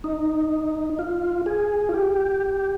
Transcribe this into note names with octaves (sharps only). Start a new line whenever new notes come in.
D#4
F4
G#4
F4
G4